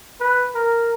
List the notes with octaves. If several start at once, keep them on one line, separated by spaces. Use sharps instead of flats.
B4
A#4